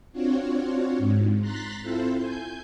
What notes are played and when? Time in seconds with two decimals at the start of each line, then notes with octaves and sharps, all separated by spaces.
0.12 C4 D4 F4 F#4 C#5
0.98 G#2
1.39 A#5 C6 F#6 A6 B6
1.82 C4 E4 F4 A4 C5
2.18 G#5 G6